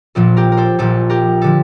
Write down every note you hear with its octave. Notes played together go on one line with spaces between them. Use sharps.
A#1 A#2 F3 A4
G4 A#4
A#4
A4 C5
A#1 A#2 F3 A4
G4 A#4
D3 F3 A4